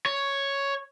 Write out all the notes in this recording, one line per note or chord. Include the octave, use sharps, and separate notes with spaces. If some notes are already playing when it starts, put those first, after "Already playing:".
C#5